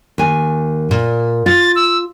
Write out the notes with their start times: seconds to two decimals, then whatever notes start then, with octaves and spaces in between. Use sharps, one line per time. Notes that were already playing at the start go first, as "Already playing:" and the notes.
0.18 D#2 G#5
0.91 A#2
1.46 F4 A6
1.76 E6